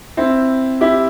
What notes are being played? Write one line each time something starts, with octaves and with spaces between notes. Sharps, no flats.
C4 E4
E4 G4